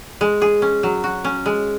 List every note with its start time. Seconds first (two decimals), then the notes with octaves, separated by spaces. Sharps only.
0.21 G#3
0.42 G#4
0.62 C#4
0.83 F#3
1.04 F#4
1.24 C#4
1.46 G#3